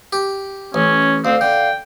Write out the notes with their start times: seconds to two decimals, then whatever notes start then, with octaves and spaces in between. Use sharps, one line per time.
0.13 G4
0.74 A1 C#4
1.25 D2 C4 F5
1.41 D3 G5